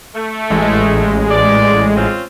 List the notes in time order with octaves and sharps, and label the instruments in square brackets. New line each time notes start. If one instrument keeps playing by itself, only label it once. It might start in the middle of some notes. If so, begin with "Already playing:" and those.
[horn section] A3
[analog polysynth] A1 G#3
[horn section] D5
C4 C#4 F4